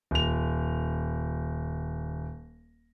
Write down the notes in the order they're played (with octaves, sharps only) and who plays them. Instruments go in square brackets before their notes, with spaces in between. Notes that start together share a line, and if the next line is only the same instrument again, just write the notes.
[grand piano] D#1 F7